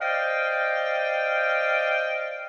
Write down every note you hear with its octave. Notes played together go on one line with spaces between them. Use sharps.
C5 D5 D#5 F5 G5